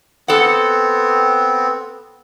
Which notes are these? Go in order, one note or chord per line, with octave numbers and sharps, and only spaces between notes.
B3 C4 A4 F#5